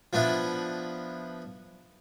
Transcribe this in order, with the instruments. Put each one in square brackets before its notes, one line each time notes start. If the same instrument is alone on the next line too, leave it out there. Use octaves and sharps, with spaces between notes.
[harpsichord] F3 B3 D4 E4